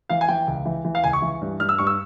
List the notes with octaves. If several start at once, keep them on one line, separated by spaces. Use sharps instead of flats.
E3 F5
G#5
E3 G5
C#2
E3
E3
F5
C#2 G#5
C#6
E3
G2
G2 F6
E6
G2 C#6
E6